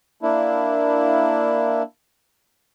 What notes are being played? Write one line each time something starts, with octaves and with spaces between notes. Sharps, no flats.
A#3 D4 E4